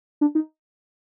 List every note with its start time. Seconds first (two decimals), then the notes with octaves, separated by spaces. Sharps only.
0.21 D4
0.35 D#4